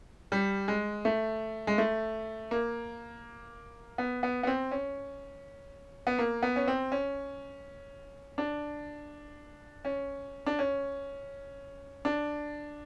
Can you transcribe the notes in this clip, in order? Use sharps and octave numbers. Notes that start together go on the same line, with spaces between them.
G3
G#3
A3
G#3
A3
A#3
B3
B3
B3
C4
C#4
B3
A#3
B3
C#4
C4
C#4
D4
C#4
D4
C#4
D4